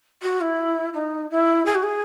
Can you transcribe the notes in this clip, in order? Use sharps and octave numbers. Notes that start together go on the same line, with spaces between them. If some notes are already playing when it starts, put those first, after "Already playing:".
F#4
E4
D#4
E4
G#4
F#4
G#4